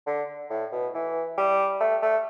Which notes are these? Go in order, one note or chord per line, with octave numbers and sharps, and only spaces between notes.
D3
A2
B2
E3
G3
A3
A3